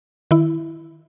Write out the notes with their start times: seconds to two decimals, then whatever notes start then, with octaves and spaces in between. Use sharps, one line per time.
0.31 D#3 E4